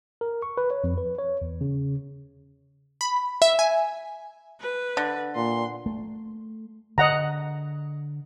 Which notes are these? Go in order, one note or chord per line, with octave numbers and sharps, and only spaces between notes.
A#4
C#6
B4
C#5
F2
B4
C#5
E2
C#3
B5
E5
G#5
B4
D3
A#2 C6
A3
D3 D#5 F#5 A#5